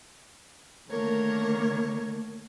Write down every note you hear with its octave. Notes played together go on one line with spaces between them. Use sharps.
D3 D#3 A3 A#3 A#4 C#5